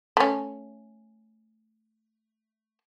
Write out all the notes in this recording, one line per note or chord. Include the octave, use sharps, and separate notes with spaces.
A3 C#4